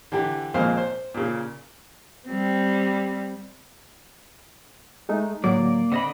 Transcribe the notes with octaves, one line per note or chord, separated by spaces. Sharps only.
D3 E3 G4
F2 A#2 G#3 C5 F5 F6
C5
A#2 C#3
G3 C4
G#3 A3 D#4
A2 D3 F#3 A#3 D5
D3 C4 D#5 B5